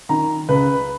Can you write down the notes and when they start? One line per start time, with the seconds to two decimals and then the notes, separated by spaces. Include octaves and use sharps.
0.09 D#3 A#5
0.49 C#2 B4